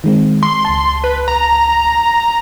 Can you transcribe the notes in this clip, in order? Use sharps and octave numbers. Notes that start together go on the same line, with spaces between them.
D#3 G#3 C4
C6
C#2 A5
B4
A#5